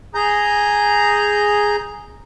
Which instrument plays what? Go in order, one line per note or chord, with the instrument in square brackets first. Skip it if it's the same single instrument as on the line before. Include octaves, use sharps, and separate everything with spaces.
[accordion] G#4 A#5 G6